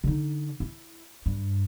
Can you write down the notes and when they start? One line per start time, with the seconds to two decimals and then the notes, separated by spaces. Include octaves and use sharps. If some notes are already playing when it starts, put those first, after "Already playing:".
0.04 D3 D#4
0.60 E4
1.26 G2